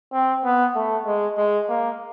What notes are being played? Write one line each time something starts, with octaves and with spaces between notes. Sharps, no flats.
C4
B3
A3
G#3
G#3
A#3